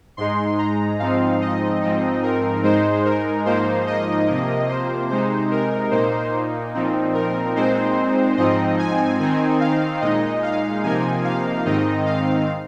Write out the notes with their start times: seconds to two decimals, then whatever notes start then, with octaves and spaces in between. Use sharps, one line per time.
0.17 G#2 G#3 D#4 C6
0.58 A#5
0.99 G#2 F3 C4 D#4 F5
1.41 D#5
1.82 G#2 F3 C4 D#4
2.23 A#4
2.63 G#2 G#3 D#4 C5
3.05 A#4
3.45 G#2 F3 A#3 D#4 C5
3.87 D#5
4.27 C3 F3 A#3
4.69 C5
5.09 C3 G#3 D#4 C5
5.51 A#4
5.91 A#2 A#3 D#4 C5
6.74 A#2 F3 C4 D#4
7.14 A#4
7.56 A#2 G#3 C4 D#4 C5
8.37 G#2 F3 C4 D#4 D#5
8.79 G#5
9.19 D#3 C4 D#4 G#5
9.61 F5
10.01 A#2 G#3 D#4 D#5
10.43 F5
10.83 C3 F3 A#3 D#4 G#5
11.24 F5
11.65 G#2 D#3 C4 D#4 D#5
12.06 F5